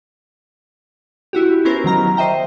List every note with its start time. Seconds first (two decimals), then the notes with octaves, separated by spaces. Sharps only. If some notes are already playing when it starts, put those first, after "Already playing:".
1.33 E4 F#4 G4
1.65 B3 C#4 E4 A#4 C5
1.84 D#3 F#3 A#5 F6
2.17 C5 D#5 E5 G5 A#5